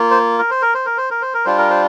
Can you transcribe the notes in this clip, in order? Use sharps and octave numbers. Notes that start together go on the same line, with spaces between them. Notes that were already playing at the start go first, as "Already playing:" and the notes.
Already playing: A#3 F4
C5
A#4
C5
A#4
C5
A#4
C5
A#4
C5
A#4
G3 D4 F4 C5
A#4
C5